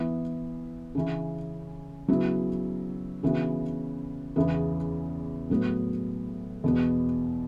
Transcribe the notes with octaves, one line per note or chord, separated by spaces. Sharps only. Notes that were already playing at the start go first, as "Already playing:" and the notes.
Already playing: E3 B3 E4
C#3 E3 C#4
C#3 F#3 B3 E4
C#3 E3 B3 F#4
E2 C#3 E3 B3
A2 F#3 B3
E2 B2 B3